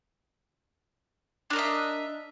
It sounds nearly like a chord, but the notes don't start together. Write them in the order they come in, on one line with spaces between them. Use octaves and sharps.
D4 A#4 D#5 E5